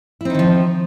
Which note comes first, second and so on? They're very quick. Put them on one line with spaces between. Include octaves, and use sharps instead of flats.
E4 C4 D#4 D#3 F3